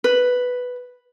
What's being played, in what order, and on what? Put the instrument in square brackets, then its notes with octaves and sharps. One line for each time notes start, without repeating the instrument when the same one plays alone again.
[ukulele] B4